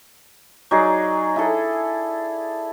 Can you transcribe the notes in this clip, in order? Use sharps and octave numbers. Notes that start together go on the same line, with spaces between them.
F#3 D#4 G#4 D5
E4 G#4 A4